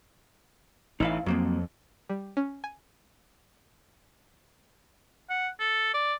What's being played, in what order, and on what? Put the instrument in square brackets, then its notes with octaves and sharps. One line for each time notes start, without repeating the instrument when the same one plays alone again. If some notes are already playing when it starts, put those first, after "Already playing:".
[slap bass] A1 E3 [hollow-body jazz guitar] D#4 E4 F5
[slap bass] F2 [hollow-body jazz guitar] F#3 A#3 C4
[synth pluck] G3
C#4
G#5
[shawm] F#5
A4
D5